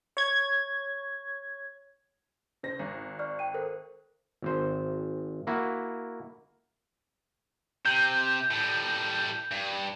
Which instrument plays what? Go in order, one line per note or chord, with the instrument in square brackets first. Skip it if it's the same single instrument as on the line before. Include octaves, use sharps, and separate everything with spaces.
[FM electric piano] C#5 G#6
[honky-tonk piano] C#3 C5 A#6
G#1
[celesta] D5 C#6 F6
G5 D#7
A4 A#4 C5
[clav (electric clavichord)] G#1 C5
A#3 E4 F#4
[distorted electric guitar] C3 [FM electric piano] G6
[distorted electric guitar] A2 G3
G2